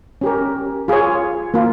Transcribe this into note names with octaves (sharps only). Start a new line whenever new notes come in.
C#4 G4 A#4
F4 G#4 C#5
A#3 F4